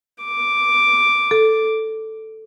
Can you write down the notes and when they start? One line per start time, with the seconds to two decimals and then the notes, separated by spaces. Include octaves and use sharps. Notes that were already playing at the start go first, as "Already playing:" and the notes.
0.23 D6
1.31 A4